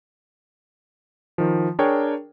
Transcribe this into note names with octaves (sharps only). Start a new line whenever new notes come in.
D#3 F3
D4 G#4 A#4 C#5 G5